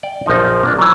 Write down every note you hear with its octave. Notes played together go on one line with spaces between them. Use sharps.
D5 G5
A#1 F#2 F3 D#4
A#3 D4 D5
E3 F#3